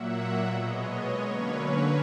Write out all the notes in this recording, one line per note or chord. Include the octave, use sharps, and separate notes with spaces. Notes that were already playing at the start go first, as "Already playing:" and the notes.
Already playing: A#2 F#3 A#3 E5 F#5
B2 G#3 B3 C#5 D#5
C#5 D#5
D3 F#3 A#3 C#4 B4 C#5